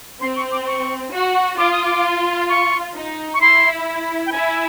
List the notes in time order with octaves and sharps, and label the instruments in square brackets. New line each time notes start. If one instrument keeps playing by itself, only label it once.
[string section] C4 [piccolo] C6
[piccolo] C#6
D6
C#6
[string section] F#4
[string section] F4 [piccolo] D6
[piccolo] D#6
D6
C#6
[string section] D#4
[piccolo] C#6
[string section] E4 [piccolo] C6
[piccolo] G5
[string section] E4 [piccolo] G#5